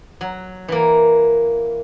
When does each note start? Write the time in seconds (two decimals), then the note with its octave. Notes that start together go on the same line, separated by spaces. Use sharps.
0.21 F#3
0.68 E3 A#3